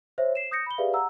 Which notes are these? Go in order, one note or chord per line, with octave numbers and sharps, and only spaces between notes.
C5 C#5 E5
C7 E7
D#6 G6 A#6 C#7
B5 G7
G4 G#4 B4 D5 E5 F5
F#5 A#5 E6